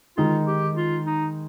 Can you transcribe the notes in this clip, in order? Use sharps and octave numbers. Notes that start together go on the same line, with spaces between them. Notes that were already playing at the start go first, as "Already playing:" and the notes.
D#3 G#3 D#4 F4
G4
F4
D#4